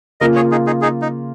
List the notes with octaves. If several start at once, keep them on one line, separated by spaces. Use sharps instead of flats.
C#3 A#3 F4 A#4 D#5
G#4 C#5
D#4 G#4
D#4 G#4
D#4 G#4
D#4